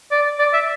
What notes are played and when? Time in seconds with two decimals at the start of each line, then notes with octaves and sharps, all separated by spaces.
0.11 D5
0.39 D5
0.53 E5